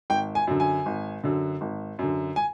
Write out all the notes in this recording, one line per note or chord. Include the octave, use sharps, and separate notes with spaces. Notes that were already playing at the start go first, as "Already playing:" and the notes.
G#1 G5
G#5
F#2 D3
G#5
G#1
F#2 D3
G#1
F#2 D3
G#5